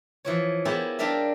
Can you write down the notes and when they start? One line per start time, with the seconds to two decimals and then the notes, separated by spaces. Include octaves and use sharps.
0.25 E3 F3 C#5
0.65 A#3 B3 E4 G4 G#4 C5
0.99 G3 D4 G4 A#4 E5 F5